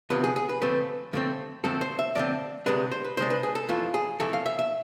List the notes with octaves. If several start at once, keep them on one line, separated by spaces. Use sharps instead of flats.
D2 C3 F3 B3 B4
G#4
G#4
B4
F2 D3 A3 C4 B4
F2 D3 A3 C4
F2 D3 A3 C4 A4
C5
E5
F2 D3 A3 C4 D5
D2 C3 G#3 D4 B4
C5
B4
D2 C3 G#3 D4 C5
B4
G#4
A4
F2 E3 A3 F4
G#4
F2 E3 A3 A4
F5
E5
E5